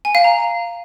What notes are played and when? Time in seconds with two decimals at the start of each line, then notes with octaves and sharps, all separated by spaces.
0.05 G#5
0.15 F5
0.24 A#5